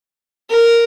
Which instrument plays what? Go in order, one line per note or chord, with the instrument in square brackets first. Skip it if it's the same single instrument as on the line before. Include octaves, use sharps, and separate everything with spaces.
[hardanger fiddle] A#4